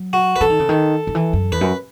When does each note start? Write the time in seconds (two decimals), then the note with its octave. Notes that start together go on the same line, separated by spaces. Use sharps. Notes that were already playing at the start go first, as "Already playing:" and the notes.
Already playing: F#3
0.13 F#4
0.36 B4
0.41 E3 A4
0.50 D#3
0.59 C#3
0.69 D#3
1.07 D#3
1.15 E3
1.33 F#2
1.52 E2 B4
1.61 F#2